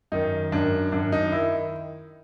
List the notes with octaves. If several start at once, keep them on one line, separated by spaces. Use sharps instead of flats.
F#2 D#3 D#4
F#2 D#3 D4
F#2 D#3 D4
D#4
D#3 E4